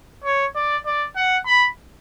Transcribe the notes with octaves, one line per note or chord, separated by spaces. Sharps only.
C#5
D5
D5
F#5
B5